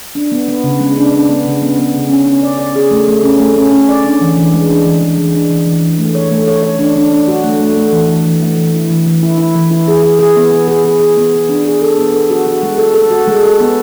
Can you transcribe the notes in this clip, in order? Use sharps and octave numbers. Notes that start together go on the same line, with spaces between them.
D4
B3
B3
C#3
G#3
D4
D4
B3
C#3
B3
B3
C#3
C#4
C#4
D5
D5
G#4
A3
A3
C#4
A3
C#4
C#4
D5
D4
E3
E3
G#3
D4
E3
E3
E3
D4
E3
E3
E3
A3
C#5
A3
C#5
C#5
D4
D4
D4
F#4
A3
A3
A3
E3
E3
E3
A3
E3
E4
E3
E3
E4
E4
E3
E4
G#4
G#4
G#4
B3
B3
G#4
G#4
G#4
B3
B3
D4
G#4
A4
B3
A4
F#4
F#4
G#3
A4
A4
F#4
G#3
A4
B3